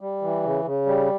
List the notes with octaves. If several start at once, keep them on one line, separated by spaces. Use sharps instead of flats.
G3
E3
C#3
C#3
G3